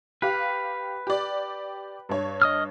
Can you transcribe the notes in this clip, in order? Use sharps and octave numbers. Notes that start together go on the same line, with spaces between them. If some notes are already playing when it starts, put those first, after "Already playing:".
G4 B4 F5
G4 D5
G2 C#5
D#5 D#6 F6